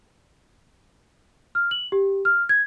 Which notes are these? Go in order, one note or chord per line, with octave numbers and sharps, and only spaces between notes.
F6
F#7
G4
F6
G#6